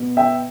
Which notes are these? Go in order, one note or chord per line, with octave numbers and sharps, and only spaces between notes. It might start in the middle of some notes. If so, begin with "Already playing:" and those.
Already playing: B2 B3
E5 G5